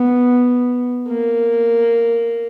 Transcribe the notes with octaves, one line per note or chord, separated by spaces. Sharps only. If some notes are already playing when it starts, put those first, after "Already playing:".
Already playing: B3
A#3